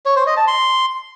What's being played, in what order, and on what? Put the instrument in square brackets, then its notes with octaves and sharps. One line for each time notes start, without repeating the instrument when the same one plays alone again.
[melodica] C#5
C5
D#5
A5
C6